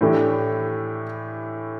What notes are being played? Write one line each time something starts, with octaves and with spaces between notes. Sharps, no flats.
A2 E3 A3 D4 G4